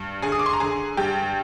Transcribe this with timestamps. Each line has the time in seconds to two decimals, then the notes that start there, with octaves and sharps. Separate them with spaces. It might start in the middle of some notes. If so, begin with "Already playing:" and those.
Already playing: G2
0.22 D3 G#4 G#5
0.32 D#6
0.39 D6
0.46 C6
0.53 A#5
0.60 D3 G#4 G#5
0.97 G2 G4 G5